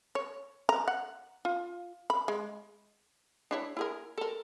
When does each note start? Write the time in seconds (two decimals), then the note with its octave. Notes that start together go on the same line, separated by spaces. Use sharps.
0.15 C#5
0.69 A#5
0.88 F#5
1.45 F4
2.10 B5
2.28 G#3
3.51 D4 E4 C#5
3.77 E4 G#4 A#4
4.18 A4 A#4